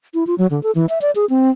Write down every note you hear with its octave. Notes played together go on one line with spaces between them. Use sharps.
E4
F4
F#3
D3
A4
E3
E5
D5
G#4
C4